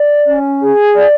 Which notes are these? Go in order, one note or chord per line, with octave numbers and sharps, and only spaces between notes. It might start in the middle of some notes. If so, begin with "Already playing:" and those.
Already playing: D5
C#4
G#4
D5